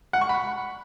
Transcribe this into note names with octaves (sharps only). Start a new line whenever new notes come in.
F#5
C#6
B5